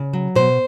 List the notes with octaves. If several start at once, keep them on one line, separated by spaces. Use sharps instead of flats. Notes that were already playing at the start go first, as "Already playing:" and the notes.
Already playing: C#3
F#3
B2 C5